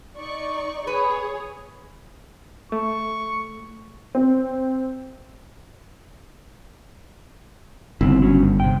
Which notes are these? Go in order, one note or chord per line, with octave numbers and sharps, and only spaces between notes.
D#4 D5 C#6
G#4 B4 C#5
A3 C#6
C4
G1 C#3 C4 E4
F#3 C#4
G2
C3 G5